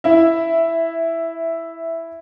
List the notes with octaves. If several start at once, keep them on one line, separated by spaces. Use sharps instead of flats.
E4 E5